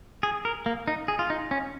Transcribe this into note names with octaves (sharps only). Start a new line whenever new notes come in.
G#4
A#4
A#3
D#4
G#4
F4
D#4
C#4